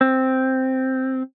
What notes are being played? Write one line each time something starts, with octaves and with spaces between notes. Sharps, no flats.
C4